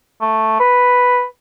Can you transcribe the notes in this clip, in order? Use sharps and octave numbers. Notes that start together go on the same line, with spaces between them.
A3
B4